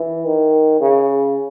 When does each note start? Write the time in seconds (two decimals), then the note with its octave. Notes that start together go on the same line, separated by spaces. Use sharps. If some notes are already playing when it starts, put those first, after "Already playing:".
Already playing: E3
0.25 D#3
0.80 C#3